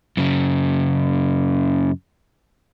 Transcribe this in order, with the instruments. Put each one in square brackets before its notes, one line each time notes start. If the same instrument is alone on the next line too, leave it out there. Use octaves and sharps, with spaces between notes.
[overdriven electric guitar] F#2 C#3